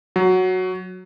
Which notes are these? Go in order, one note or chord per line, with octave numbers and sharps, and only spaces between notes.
F#3